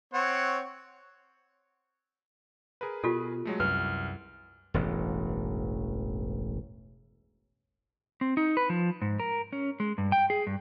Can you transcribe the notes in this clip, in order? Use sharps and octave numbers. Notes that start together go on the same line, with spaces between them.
C4 C#5 F#5
G#4 A#4 B4
B2 F4 G4 A4
F#3 G#3 A3
C2 F#2 B4 F6
E1 A1 G2
C4
D#4
B4
F3
G#2
A#4
C#4
G#3
G2
G5
G#4
G2